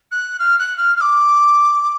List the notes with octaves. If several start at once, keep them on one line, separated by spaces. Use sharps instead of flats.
F#6
F6
F#6
F6
F6
D6